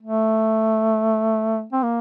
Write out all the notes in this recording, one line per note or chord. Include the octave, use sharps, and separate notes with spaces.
A3
C4
A#3